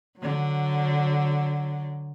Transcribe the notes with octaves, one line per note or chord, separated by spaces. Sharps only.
D3 F#3